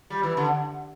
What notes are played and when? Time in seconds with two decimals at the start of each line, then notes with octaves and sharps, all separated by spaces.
0.10 G3
0.23 E3
0.37 D3